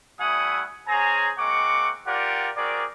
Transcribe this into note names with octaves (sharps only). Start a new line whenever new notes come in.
G3 A3 E4 F#5 G#5 D#6
C#4 G#4 C5 G#5 A#5
G#3 A#3 C4 F#5 C#6 D6
F4 G4 A#4 D5 F#5
C4 F#4 G#4 A#4 D5